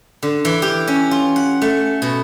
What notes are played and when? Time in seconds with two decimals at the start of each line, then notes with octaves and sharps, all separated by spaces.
0.23 D3
0.45 E3
0.62 G4
0.87 C#4
1.11 F4
1.36 F#5
1.62 A3
2.02 B2